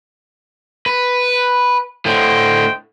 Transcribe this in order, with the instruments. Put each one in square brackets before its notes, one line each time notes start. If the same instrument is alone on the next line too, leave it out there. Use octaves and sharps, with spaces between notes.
[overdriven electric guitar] B4
[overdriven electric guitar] A2 D3 [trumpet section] C5 D#5 G5